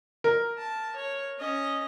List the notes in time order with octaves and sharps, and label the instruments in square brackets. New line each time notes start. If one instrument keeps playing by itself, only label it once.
[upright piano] A#4
[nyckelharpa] A5
C#5
C#4 D#5